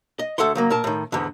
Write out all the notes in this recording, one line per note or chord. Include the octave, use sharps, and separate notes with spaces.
D#5
D2 A4 E5 F#5 C6
C#3 F#3 A#3
A#2 A#4 A5
A2 D#3
E2 G#2 D3